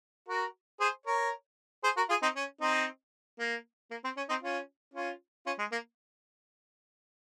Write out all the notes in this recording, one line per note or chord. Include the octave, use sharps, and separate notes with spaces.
F#4 A#4
G#4 C5
A#4 C#5
G#4 C5
F#4 A#4
F4 G#4
C4 D#4
C#4
C4 D#4
A#3
A#3
C4
C#4
C4 D#4
C#4 F4
C#4 F4
C#4 F4
G#3
A#3